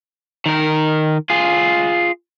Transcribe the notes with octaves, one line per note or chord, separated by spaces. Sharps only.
D#3 A#4
F4 G#4